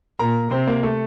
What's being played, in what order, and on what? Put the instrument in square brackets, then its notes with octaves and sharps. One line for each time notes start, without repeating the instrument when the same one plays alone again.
[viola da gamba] A#2 [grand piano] A#4 A#5
[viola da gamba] C3 [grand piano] C4 C5
[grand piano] A#3 A#4
A3 A4